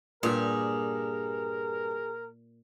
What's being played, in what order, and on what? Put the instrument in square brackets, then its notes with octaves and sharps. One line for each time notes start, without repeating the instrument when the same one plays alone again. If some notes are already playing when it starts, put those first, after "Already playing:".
[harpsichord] G2 [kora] A#2 G4 [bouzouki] G#4 [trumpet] A#4